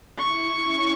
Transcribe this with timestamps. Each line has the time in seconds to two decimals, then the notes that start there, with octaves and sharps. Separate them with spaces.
0.19 E4 C#6
0.65 C#4